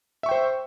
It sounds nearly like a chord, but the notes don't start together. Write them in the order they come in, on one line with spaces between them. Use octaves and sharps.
E5 C#6 G5 C5